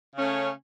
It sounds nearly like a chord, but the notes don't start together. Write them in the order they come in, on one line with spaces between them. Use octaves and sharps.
C#3 C#4 A3